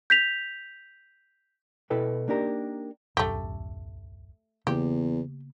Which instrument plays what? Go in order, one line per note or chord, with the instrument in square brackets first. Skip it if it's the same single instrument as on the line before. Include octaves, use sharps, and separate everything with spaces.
[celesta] G6 B6 F7
[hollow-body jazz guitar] B2 E4 A4 B4 G5
A#3 D4 D#4 G4 A#4
[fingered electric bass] D1 B1 F#2 [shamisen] A3 G4
[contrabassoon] E2 [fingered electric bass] C#3 A#3 B3 [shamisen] G4